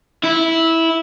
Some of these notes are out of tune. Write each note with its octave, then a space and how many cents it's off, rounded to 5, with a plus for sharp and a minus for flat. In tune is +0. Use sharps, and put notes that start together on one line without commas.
E4 -10